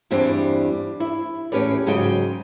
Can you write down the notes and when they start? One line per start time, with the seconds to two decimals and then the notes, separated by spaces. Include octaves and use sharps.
0.11 E2 G2 G3 C4 D4
1.00 E4
1.52 E2 A2 C#4 G4 B4 D5
1.86 G#2 C#3 F#3 D#5 G5